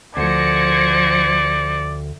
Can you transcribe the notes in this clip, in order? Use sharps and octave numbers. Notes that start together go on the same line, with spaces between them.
D2 F3 C5 D5 G#6 A#6 C#7